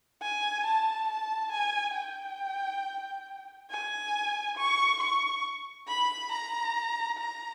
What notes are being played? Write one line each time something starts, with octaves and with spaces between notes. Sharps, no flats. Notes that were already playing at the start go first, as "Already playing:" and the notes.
G#5
A5
A5
G#5
G5
G#5
C#6
C#6
B5
A#5
A#5